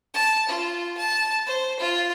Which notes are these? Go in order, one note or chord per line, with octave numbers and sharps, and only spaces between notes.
A5
F4
A5
C5
F4